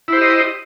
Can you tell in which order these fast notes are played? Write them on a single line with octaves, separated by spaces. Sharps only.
E4 C5 G4 D#5